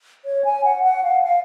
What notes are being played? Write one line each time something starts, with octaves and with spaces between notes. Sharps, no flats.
C#5
G#5
F#5
F#5
F5
F5